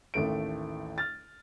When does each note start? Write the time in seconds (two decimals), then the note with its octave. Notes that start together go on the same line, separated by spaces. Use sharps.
0.14 A1 D#2 A3 D7
0.98 F6 A6